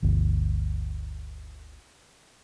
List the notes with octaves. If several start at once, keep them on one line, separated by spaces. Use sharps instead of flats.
G1 D2